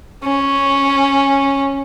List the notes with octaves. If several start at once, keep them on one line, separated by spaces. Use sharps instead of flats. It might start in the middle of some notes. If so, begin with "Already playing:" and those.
C#4